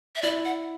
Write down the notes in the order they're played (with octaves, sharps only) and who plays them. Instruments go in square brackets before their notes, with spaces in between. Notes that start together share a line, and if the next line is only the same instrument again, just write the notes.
[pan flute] E5
[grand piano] E4 [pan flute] D5
[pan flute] F#5